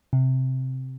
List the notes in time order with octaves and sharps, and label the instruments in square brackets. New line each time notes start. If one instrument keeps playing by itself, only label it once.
[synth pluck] C3